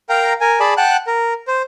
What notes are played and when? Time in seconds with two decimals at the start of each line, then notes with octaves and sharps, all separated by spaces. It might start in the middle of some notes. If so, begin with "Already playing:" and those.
0.09 A#4 F5 G5 A#5
0.41 A#4 G#5
0.60 G#4 D5 A5 B5
0.77 F#5 G5 A5 F#6
1.07 A#4
1.47 C5